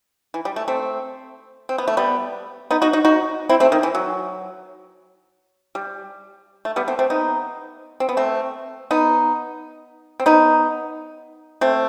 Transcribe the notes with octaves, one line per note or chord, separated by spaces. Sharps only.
E3
G3
A3
A3 C4
C4
B3
A3
G3 B3
B3 D#4
D#4 F#4
D#4 F#4
D#4 F#4
C4 E4
A3 C4
D#3
E3
F#3
G3
A3
G3 B3
A3 C4
A3 C4
B3 D#4
C4
B3
A3 C4
B3 D#4
C4
B3 D#4
A3 C4